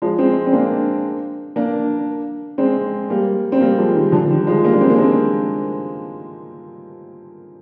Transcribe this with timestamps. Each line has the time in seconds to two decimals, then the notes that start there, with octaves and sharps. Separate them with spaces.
0.02 F3 G#3
0.19 G#3 C4
0.47 C4
0.53 A#3 D4
1.56 A#3 D4
2.58 G#3 C4
3.10 G3 A#3
3.52 C4
3.61 G3 A#3
3.78 F3 G#3
3.95 D#3 G3
4.12 D3 F3
4.30 D#3 G3
4.47 F3 G#3
4.63 G3 A#3
4.73 D4
4.81 G#3 C4
4.90 A#3
4.98 G#3 C4